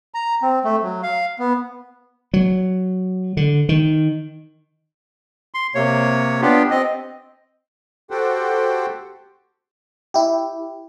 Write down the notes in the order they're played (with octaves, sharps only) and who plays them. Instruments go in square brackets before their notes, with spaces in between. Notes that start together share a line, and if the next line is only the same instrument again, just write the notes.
[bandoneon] A#5
C4
A3
F#3
F5
B3
[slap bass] F#3
D3
D#3
[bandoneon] C6
C3 A#3 C#5
B3 D4 F4 G4
C4 D#5
[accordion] F#4 G4 A4 C5 F#5 G5
[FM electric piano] E4 G4